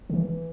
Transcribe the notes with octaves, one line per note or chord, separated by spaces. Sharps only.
D3
E3